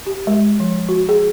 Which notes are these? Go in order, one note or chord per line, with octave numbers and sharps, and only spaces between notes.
G4
G#3
F3
F#4
G#4